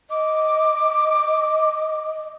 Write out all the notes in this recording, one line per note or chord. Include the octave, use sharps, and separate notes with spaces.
D#5 D6